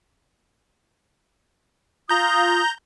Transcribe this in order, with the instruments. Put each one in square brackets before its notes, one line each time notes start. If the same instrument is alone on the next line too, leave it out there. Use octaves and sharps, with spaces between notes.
[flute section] F4 D#6 [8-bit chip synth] A#5 G6